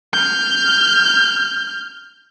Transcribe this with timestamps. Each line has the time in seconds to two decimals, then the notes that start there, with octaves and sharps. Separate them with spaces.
0.13 F6 G6